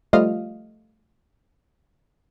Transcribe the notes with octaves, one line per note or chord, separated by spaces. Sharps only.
F3 G3 A3 F4 D#5 F5